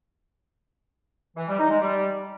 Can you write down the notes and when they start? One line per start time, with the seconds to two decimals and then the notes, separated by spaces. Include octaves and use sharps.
1.36 E3
1.47 G3
1.58 D#4
1.69 G#3
1.80 G3